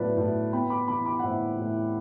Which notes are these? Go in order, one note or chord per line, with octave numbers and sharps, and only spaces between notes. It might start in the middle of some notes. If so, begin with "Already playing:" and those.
Already playing: A2 F#3 B3 B4 D5
A2
B3 G5 B5
B5 D6
E3 B5 D6
B5 D6
F#5
A2 C5 E5
A2